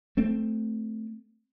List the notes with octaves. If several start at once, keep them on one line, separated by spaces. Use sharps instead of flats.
A3 C4